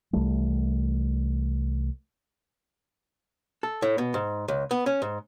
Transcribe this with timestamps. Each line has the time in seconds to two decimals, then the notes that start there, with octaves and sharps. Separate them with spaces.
0.13 C2 E3 G3 A3
3.63 A4
3.82 A2
3.98 B2
4.14 G#2
4.48 C#2
4.71 B3
4.86 C#4
5.02 G#2